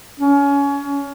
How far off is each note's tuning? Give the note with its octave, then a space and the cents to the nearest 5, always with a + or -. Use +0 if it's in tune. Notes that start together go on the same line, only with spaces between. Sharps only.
C#4 +25